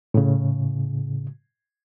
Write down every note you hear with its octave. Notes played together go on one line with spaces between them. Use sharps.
A2 C#3